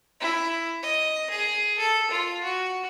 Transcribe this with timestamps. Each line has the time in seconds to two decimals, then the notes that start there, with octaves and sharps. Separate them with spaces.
0.21 E4
0.83 D#5
1.30 G#4
1.79 A4
2.11 F4
2.44 F#4